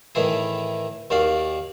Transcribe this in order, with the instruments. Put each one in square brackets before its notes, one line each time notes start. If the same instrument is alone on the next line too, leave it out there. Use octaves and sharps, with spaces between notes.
[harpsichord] A2 D#3 E3 E4 G#4
D#2 D#3 F#4 D5 F5